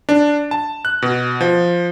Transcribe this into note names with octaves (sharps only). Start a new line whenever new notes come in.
D4
A5
F#6
B2
F3